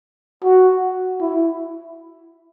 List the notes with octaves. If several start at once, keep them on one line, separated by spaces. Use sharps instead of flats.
F#4
E4